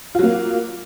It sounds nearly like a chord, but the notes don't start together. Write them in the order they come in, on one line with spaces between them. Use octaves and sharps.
F4 F#3 A#3